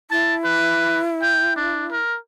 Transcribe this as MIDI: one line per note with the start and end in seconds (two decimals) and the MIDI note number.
0.11 1.96 64
0.11 0.35 81
0.45 1.01 71
1.22 1.54 79
1.56 1.86 62
1.91 2.18 70